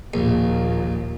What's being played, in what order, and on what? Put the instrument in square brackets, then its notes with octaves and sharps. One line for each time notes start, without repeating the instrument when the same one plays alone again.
[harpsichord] A#1 [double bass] D#2 A#2